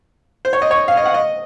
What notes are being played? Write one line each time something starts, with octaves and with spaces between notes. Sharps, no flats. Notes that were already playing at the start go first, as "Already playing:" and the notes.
C5
C#5
D#5
C#5
F5
D#5
F#5
D#5